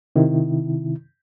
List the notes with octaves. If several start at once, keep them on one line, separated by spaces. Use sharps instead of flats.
C3 D#3 E4